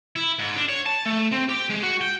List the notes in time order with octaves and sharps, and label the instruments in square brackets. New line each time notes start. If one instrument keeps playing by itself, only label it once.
[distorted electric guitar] E4
G#2
D4
C#5
A5
A3
C4
G4
G#3
F#4
G5